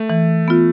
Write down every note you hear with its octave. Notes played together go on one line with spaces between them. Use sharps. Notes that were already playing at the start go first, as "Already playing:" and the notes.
Already playing: A3
E3
B3 F4